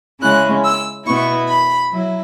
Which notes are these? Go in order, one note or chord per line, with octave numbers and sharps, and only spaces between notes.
C#3 G#3 C#4 E4 F#6
E6
B2 B3 E4 C#6
B5
F#3 E4